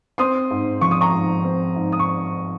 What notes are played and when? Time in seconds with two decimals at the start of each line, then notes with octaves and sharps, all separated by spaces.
0.18 C4 C6 D#6
0.51 G#2
0.81 F3 C#6
0.91 D#6
1.01 A#5 C#6
1.12 G#2
1.44 C4
1.76 G#2
1.92 D#6
1.99 C#6